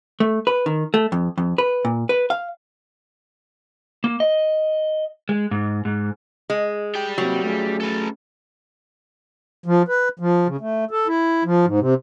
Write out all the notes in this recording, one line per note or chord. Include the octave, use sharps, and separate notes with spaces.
A3
B4
D#3
A3
F2
F2
B4
A#2
B4
F5
A#3
D#5
G#3
G#2
G#2
G#3
G3 G5
C3 F#3 A#3 G4
A3 C#4 G#4
A4 B4
F3
B4
F3
C#3
A3
A4
E4
F3
G#2
C3